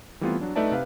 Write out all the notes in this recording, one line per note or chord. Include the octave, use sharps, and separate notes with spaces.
E3 G3 A3 B3 C4 F4
F#3 D4
A3 D#4 B4 D5 E5 A5
C3 B4 F5